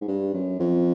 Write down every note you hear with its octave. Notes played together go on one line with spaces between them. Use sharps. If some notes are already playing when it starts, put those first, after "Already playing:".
G#2
G2
F#2
F2